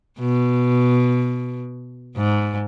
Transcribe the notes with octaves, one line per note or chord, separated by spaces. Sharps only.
B2
G#2